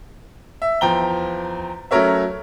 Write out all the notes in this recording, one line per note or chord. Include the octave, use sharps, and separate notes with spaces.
E5
E2 F3 G5 A#5 G7
F#3 A3 C#4 A#4 C#5 E5